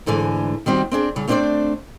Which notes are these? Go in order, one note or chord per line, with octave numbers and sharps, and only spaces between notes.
D2 G#2 D3 E3 G#5
D#3 G3 C4 F#4
C4 D4 G#4
C#3 G3
A3 C4 D4 A#4 C5 D5